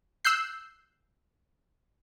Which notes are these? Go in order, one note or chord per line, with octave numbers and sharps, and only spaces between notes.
E6 F#6 G6 C7